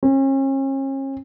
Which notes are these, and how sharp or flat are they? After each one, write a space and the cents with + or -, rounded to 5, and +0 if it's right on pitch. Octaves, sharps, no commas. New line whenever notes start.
C#4 -40